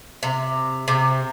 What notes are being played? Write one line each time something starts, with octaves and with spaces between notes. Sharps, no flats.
C3
C3